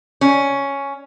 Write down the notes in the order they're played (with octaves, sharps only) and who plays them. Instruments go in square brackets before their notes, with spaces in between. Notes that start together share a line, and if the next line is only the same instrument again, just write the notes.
[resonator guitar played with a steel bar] C#4